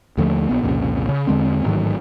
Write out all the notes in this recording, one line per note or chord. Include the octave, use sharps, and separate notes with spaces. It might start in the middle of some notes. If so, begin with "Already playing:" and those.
D#2 D3 F3 A3
A#1 B3
C2 F2 A#2 C#3
C#3
E2 D3 G#3 C4
A1 G#2 D#3 F#3